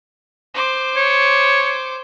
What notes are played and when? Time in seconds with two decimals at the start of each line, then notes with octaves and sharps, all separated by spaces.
0.54 C5 D6
0.96 C#5